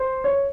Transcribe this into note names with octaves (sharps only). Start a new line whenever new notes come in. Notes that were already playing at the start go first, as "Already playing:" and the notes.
Already playing: C5
C#5